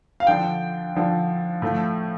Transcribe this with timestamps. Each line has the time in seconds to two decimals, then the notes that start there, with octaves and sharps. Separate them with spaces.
0.20 F5
0.27 D3 F3 D4 G5
0.95 D3 F3 D4
1.62 A2 F3 A3